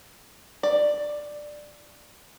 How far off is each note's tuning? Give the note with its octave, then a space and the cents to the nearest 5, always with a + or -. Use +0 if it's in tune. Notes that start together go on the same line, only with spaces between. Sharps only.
D5 +10